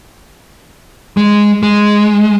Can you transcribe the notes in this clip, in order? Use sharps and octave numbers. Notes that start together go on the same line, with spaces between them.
G#3
G#3